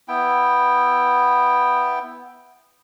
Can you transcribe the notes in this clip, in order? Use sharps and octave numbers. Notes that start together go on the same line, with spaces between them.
B3 E4 G5